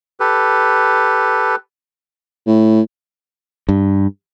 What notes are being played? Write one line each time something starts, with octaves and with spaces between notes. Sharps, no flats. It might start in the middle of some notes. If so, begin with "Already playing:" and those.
G4 A4 B4
A2
G2